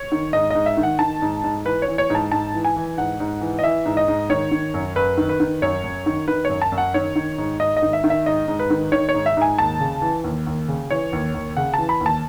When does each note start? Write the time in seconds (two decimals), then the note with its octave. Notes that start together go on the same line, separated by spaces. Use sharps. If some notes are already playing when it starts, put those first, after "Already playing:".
Already playing: C#5
0.12 D#3
0.33 G#2 D#5
0.51 G#2 D#5
0.66 E5
0.77 D#3
0.83 F#5
0.99 D#3 A5
1.22 G#2
1.44 G#2
1.65 E3 B4
1.82 C#5
1.88 E3
1.98 C#5
2.10 G#2
2.15 A5
2.32 G#2 A5
2.54 E3
2.64 G#5
2.76 E3
2.97 G#2 F#5
3.20 G#2
3.41 E3
3.59 D#5
3.63 E3 E5
3.85 G#2
3.97 D#5
4.08 G#2
4.30 D#3 C#5
4.51 D#3
4.74 F#2
4.96 F#2 B4
5.18 D#3
5.29 B4
5.40 D#3
5.62 F#2 C#5
5.84 F#2
6.06 D#3
6.28 D#3 B4
6.45 F#2 C#5
6.62 A5
6.72 F#2
6.78 F#5
6.94 D#3 C#5
7.16 D#3
7.38 G#2
7.60 G#2 D#5
7.77 D#5
7.82 D#3
7.93 E5
8.04 D#3
8.10 E5
8.26 G#2 D#5
8.48 G#2
8.59 B4
8.70 D#3
8.92 D#3 C#5
9.09 C#5
9.14 G#2
9.26 E5
9.37 G#2 G#5
9.59 D#2 A5
9.80 C#3
10.02 E3
10.24 D#2
10.47 D#2
10.68 C#3
10.90 E3 C#5
11.13 D#2
11.34 D#2
11.57 C#3 F#5
11.74 E3 A5
11.89 B5
12.01 D#2
12.06 A5